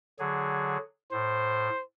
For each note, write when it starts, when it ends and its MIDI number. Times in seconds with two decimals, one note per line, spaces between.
0.19 0.77 50
0.19 0.77 54
0.19 0.77 68
1.12 1.69 45
1.12 1.82 72